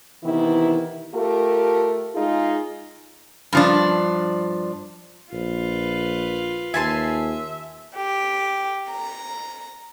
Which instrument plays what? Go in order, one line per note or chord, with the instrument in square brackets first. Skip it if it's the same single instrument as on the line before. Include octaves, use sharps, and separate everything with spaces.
[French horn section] C3 D#3 E3 B3 E4
A3 F4 G4 A#4
G#3 D#4 F4 G#4
[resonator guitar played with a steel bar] G2 F3 D4
[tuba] A#1 [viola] F4 B4
[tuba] D#2 [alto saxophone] E5 [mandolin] G#5 A5 C6
[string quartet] G4
A#5